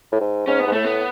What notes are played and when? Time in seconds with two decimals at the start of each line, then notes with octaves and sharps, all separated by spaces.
0.12 A2
0.21 G#2
0.47 G#2 C#4
0.59 B3
0.67 G#2
0.73 A2 A3
0.85 B3